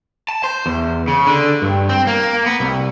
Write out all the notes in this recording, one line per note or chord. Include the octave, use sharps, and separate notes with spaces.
A5
C5
E2
C#3
D3
G2
C4
A#3
B3
C2